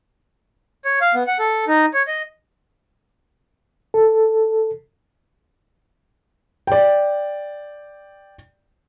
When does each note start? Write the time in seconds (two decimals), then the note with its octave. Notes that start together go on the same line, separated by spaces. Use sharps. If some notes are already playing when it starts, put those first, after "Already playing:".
0.85 C#5
1.01 F5
1.15 B3
1.27 F#5
1.39 A4
1.68 D#4
1.94 C#5
2.08 D#5
3.94 A4
6.67 D5 G5